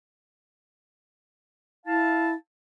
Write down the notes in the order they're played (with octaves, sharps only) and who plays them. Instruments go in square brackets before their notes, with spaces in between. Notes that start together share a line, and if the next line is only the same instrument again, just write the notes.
[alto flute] E4 [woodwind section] F5 A5